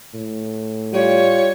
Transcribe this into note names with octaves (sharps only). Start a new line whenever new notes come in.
A2
G3 F4 C#5